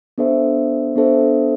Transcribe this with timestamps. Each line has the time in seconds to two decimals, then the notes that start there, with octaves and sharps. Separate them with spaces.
0.18 B3 D4 A4 C5 E5
0.95 B3 D4 A4 C5 E5